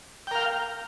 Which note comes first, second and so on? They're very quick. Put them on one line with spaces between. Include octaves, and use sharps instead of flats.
G5 A#4 F5